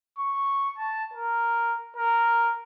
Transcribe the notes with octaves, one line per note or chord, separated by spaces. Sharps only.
C#6
A5
A#4
A#4